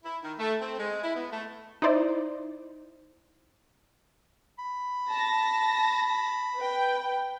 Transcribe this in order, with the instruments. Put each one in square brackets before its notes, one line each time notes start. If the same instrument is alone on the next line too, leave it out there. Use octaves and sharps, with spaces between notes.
[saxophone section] E4
D#3
A3
C4
G#3
E4
B3
A3
[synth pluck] D#4 E4 C5 D5
[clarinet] B5
[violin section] A5 A#6
B4 G5